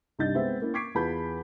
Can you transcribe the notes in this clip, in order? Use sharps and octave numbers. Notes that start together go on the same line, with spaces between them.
C2 G2 D#4 D#5 G6 A6
G#3 B3 C4 C5 E5
A#3 C#4 E4
C#6 D6 G#6 B6 C7 D7
E2 F4 B4 A5 B5 G6